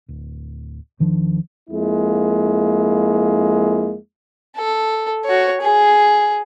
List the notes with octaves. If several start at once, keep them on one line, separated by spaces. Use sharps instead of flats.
D1
E1 D#3 F3 D4
F2 G#3 A#3 E4
A4
F#4 C#5
G#4